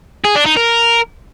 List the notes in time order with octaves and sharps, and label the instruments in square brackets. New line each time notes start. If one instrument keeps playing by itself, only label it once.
[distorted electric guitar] G#4
D4
D#4
A#4